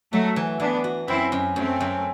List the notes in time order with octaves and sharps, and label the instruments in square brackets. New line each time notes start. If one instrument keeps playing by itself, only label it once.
[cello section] F#3 A3 [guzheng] F#4
[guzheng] E3
[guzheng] E3 [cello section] B3 D4
[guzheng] F#4
[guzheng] F#2 [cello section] C4 E4
[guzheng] F#2
[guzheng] F#2 [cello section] A3 C4
[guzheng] F#2